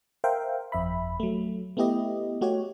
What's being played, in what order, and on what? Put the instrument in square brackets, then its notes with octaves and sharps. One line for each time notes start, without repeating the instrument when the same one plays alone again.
[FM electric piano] A#4 C5 E5 F5 G5
G1 F2 E5 B5
F#3 A3
A3 B3 E4 G4 D#5
A3 F#4 G4 C#5